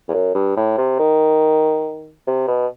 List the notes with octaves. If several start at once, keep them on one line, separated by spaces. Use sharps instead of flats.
E2
F#2
G2
A2
C3
D#3
C3
B2